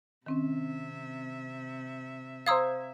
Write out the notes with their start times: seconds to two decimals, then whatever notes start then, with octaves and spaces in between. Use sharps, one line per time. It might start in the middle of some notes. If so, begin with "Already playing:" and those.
0.26 C3 D#3 C4 C#4 E5
2.46 C5 F5 A#5 D#6 E6 G#6